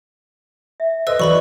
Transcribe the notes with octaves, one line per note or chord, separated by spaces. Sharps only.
E5
A4 B4 C5 D#5 C6 E6
E3 F#3 B4 D5 B5 C#6